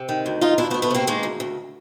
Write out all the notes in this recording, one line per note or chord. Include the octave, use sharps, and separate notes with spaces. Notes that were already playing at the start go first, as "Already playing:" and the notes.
Already playing: C3
D#3
D2
D2 D#4 F4
D2 D4 E4
A3 B3
D2
A3 B3
C3 A#3 C4
D#3 G#3 A#3
D2
D2